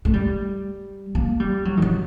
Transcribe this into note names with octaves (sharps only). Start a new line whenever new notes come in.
A3
G3
A#3
G3
F#3
D#3
F#3